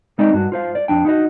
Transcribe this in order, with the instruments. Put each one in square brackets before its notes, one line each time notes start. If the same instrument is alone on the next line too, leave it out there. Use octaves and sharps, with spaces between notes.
[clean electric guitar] G#3 C4 D#4 D5 D#5
G2 F#4
F4 C5 F5
D5
F2 D4 G5
D#4 E4 F#4 D#5